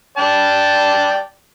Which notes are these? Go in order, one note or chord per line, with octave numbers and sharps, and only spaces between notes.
D5 G5 A5